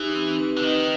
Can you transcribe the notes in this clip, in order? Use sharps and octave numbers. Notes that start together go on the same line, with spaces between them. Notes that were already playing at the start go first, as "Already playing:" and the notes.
Already playing: E3 D#4 G4
C4
B4
D3
D#3 D#5